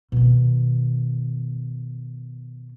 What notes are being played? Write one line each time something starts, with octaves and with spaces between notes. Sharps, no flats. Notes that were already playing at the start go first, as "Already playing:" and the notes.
B2 D#3